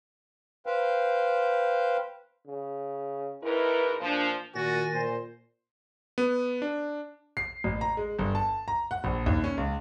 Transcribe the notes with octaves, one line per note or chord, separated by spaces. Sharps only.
B4 C5 F5 G5
C#3
G#2 E4 A#4 B4
A#2 F3 D4
A#2 D#3 F#4 G#5 A6 A#6
A#2 C5
B3
D4
C7
A1
A#5
G#3
G1
A5
A#5
F#5
A#1
D#2
C#4
C#2